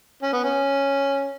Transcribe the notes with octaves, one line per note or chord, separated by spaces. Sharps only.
C#4
B3
C#4